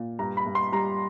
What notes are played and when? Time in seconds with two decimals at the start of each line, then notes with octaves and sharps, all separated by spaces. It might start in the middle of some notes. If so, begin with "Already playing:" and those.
Already playing: A#2
0.19 G2 A#5
0.37 B5
0.46 G2
0.55 C6
0.72 G3 A#5